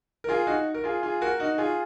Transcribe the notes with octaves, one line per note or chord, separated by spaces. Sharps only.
A#4
F4 G#4
D#4 F#4
A#4
F4 G#4
F4 G#4
F#4 A#4
D#4 F#4
F4 G#4